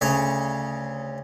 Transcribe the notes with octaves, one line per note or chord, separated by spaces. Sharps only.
D2 C#3 C#5